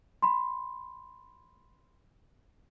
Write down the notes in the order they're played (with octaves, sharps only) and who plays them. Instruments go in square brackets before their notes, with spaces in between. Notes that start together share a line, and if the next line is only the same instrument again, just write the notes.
[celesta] B5 C6